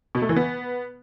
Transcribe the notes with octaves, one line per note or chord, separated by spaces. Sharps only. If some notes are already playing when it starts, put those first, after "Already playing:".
B2
A3
E3
B3